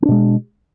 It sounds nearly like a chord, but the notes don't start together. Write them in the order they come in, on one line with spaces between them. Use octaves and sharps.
C4 D4 B2 G#3